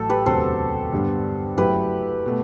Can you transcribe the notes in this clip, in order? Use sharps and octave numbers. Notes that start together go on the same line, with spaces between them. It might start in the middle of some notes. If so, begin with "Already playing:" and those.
Already playing: A1 A2 F#3 A4
G4 B4
E1 D2 C3 F#3 A4 C5
G2 D3 G3 B3 D4
F#1 F#2 F#3 A3 E4 G4 B4
B2 A3